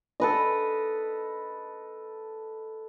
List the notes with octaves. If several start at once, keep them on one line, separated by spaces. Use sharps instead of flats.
A4 B4 D#5